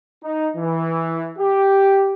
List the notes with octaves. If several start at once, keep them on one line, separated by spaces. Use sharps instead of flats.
D#4
E3
G4